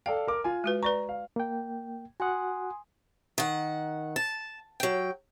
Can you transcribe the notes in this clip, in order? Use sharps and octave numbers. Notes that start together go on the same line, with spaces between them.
A4 D5 F5 G5
A#4 D6
F4 G#5
G#3 F#4 B4
B4 D5 A#5 C#6
F5
A#3 G5
F#4 F#5 G#5 C6 D#6
D#3 F#5
A5
F#3 G5